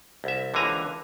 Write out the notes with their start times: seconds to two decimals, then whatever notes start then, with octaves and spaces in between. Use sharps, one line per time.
0.24 C2 E5
0.54 C#2 D3 E3 A#3 G#5 A#5